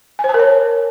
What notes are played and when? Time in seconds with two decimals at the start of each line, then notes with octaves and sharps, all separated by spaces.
0.19 G#5
0.24 C5
0.29 A5
0.34 A#4
0.39 C#5